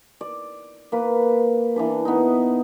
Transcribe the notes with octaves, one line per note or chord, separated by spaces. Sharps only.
D5
A#3 B4
E3 D4 B4
B3 D#4